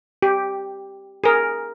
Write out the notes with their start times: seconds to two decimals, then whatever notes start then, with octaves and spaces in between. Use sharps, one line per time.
0.22 G4
1.24 G#4 A#4